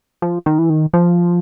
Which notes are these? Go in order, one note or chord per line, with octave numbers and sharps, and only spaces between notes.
F3
D#3
E3
D#3
F3